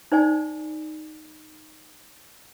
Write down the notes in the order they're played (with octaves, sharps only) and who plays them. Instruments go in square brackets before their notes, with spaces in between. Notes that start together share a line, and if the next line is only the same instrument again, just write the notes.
[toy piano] D#4 C5 D5 G#5